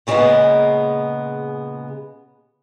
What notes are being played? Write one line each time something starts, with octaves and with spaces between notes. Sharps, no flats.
A#2 C#3 G3 G#3 A#3 B3